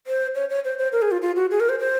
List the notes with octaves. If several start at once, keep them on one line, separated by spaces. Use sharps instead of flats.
C5
C#5
C#5
C5
C5
A#4
G#4
F4
F4
F#4
G#4
A#4
C5
C5